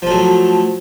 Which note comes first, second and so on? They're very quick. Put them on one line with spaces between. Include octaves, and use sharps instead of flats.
F3 A3 F#3